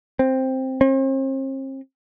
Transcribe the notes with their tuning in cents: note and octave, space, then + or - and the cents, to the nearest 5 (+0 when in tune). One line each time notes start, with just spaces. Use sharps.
C4 +5
C4 +40